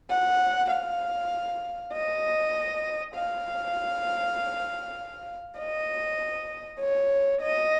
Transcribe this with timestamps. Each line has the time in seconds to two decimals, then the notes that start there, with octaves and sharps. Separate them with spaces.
0.10 F#5
0.71 F5
1.93 D#5
3.14 F5
5.58 D#5
6.80 C#5
7.41 D#5